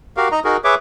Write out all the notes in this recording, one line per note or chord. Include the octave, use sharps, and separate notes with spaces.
F#4 G4 A#4 F5
D#4 D#5 A#5
D#4 F#4 G#4 A#4
G#4 B4 C#5 E5 D6